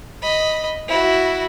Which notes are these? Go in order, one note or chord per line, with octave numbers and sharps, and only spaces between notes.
D#5 B5
E4 F#4